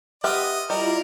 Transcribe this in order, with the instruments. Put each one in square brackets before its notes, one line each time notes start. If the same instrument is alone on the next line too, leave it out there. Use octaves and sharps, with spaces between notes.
[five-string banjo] B3 G4 E5 [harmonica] D#5 [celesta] C6 F6
[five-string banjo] G3 [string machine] E4 F4 D5 [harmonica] A#4 [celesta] D#5